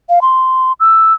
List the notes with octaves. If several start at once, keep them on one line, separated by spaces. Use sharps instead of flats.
F5
C6
E6